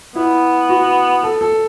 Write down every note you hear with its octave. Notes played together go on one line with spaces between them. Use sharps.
B3 E4
F#4
A4
A4